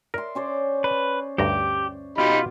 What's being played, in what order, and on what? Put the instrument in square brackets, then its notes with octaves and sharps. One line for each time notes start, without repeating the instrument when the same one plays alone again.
[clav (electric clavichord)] A#4 [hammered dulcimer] D5 E5 C6
[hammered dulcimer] C#4 C5 D5
[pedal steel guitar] B4
[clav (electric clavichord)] D2 G2 A#5 [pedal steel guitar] G4
[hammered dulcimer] B2 C6 D6 [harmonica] D#4 G4 B5 [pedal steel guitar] F4